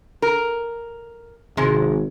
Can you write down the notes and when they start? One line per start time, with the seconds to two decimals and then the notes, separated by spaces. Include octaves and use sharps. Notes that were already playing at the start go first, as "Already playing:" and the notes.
0.22 A#4
1.57 G#1 C3 G#3